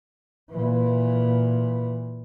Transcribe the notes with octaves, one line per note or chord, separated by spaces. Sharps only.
A#2 E3